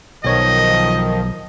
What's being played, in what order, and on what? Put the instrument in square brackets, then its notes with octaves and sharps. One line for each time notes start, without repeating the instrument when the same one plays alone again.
[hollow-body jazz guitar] B1 C#5 [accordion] D#3 F3 [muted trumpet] D#5